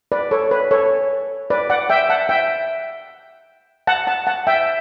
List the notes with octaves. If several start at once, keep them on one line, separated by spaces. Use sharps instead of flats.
B4 D5
A4 C#5
B4
A4 C#5
B4 D5
D5 F#5
E5 G5
F#5 A5
E5 G5
F#5 A5
F#5 A5
F#5 A5
E5 G5